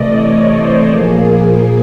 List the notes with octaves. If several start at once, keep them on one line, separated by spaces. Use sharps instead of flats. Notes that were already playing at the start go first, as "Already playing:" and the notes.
Already playing: C3 E3 A3 D5 D#5
C#5
C5
A#2 F3 A#3 G#4